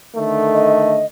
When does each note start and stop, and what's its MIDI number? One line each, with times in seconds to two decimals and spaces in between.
0.14 1.02 50
0.14 1.02 51
0.14 1.02 57
0.54 1.05 75